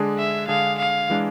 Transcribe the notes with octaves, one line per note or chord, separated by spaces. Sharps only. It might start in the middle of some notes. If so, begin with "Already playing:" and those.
Already playing: D3 G#3 D4 G#4
E5
D3 G#3 D4 G#4 F5
F5
E3 G#3 D4